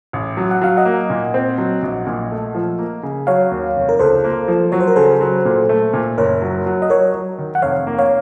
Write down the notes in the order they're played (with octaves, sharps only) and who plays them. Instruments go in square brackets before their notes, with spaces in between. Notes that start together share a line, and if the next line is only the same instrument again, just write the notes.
[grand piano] A1
F#3
[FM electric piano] F#5
[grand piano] F#3 [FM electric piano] F5
[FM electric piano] D#5 F#5
[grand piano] A#3
A#2
C4
F#3
A#1
A#2
A3
F3
A#3
C#3
[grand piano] F#3 [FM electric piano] C#5 F5
[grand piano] D#2
F1
[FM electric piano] A#4
[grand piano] C#2 [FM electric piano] A4 C5
[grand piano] A#3
F3
[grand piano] F#3 [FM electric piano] C#5
[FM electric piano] C5
A#4
[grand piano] C#3 [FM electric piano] A4 C5
[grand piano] F#3
A#2
A3
A#2
[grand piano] F#1 [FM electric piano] A#4 C#5
[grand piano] F#3
F#3
[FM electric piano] D#5
[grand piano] F#3 [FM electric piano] A#4 C#5
[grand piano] F#3
D#3
[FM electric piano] F#5
[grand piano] F1 [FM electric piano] C#5 F5
[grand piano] A#3
[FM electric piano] C#5 F5